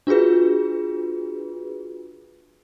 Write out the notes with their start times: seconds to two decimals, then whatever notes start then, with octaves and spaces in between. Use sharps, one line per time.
0.07 D4 F4 F#4 G#4 B4